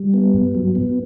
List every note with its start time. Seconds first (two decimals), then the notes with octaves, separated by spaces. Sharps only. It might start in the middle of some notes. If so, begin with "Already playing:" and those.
Already playing: G3
0.14 B3
0.34 G2
0.55 F#3
0.75 B3